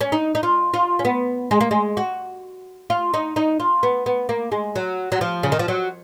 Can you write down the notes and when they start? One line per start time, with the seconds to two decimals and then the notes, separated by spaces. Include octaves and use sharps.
0.01 C#4
0.12 D#4
0.35 D#4
0.43 F4
0.74 F4
0.99 C#4
1.05 B3
1.51 G#3
1.61 A#3
1.71 G#3
1.97 F#4
2.90 F4
3.14 D#4
3.36 D#4
3.60 F4
3.83 B3
4.06 B3
4.29 A#3
4.52 G#3
4.76 F#3
5.12 F#3
5.21 F3
5.43 C#3
5.52 D#3
5.59 F3
5.68 F#3